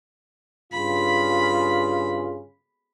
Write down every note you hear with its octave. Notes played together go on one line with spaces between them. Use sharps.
G2 C#3 F4 B5